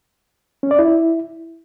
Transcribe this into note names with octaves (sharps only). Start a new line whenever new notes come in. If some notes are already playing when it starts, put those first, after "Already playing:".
C#4
D5
E4